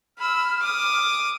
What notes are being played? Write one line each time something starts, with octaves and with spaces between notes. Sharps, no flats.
B5 E6 F6
D6 D#6